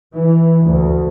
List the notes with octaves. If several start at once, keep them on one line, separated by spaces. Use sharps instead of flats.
E3
D2